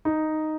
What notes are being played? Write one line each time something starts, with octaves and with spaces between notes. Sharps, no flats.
D#4